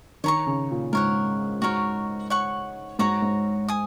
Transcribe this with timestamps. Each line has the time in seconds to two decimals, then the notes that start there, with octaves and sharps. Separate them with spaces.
0.24 D#3 C#5 A#5 C#6
0.47 C#3
0.71 A#2
0.93 G#2 A#4 C#5 F#5
1.62 G#2 F#4 A#4 C#5
2.30 C#5 F#5 C#6
2.99 G#2 F#4 C#5 A#5
3.22 G#2
3.69 G#5 D#6